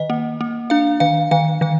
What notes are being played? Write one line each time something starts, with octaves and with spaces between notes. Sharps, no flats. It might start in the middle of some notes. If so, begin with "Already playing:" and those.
Already playing: D#3 D#5
A#3
A#3
D4 F5
D#3 F5
D#3 F5
D#3 F5